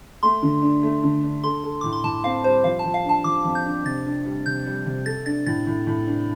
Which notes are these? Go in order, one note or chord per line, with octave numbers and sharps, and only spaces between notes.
A3 C6
D3
D4
A3
D3
D4
A4 C6
A4
A2 D6
C6
A2 A5
C4 F5
G3 C5
F3 F5
A5
F3
F5
D4 A5
F3 D6
F2
G6
D4
C3 A6
D4
G3
C3 G6
G3
C3
A4 A6
D4 A6
A2 A6
A2
A2
D4